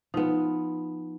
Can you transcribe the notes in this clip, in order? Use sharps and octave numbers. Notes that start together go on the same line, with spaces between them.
F3 B3 D#4